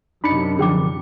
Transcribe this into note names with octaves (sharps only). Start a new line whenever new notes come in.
F#2 C3 D4 D#4 B5 C#7
D3 F3 G#4 G5 D6